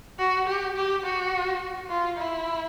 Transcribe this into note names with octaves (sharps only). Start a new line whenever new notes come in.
F#4
G4
G4
F#4
F4
E4